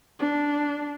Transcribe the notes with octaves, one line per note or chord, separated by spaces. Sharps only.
D4